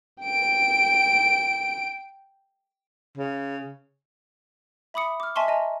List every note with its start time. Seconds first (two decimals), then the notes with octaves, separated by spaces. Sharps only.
0.23 G5 D7
3.17 C#3
4.94 E5 B5 D6 D#6 C#7
5.20 D6 F6
5.36 D#5 E5 G#5 A5 C6 C#6
5.48 D#5 G#5 A#5